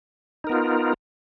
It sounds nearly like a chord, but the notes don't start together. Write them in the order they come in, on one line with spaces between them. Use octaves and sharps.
D#4 A#4 B3 F4